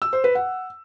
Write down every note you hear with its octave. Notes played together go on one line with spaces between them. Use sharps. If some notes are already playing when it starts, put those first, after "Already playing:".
E6
C5
B4
F#5